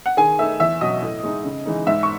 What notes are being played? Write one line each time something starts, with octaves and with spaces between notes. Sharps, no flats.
F#5
D#3 G#4 G#5
A3 D#4 E5 E6
E2 E5 E6
B2 F#3 D#5 D#6
A2
G#3 D#4
C#3
E3 G#3 D#4
G#2 E5 E6
C#6